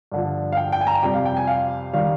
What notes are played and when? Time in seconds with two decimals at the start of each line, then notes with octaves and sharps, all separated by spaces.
0.12 G2 D3 F3
0.52 F5
0.57 G5
0.72 G5
0.81 G#5
0.87 A#5
1.02 F2 C3 G3 G5
1.14 F5
1.25 G5
1.37 G#5
1.47 F5
1.93 D#3 G3 F5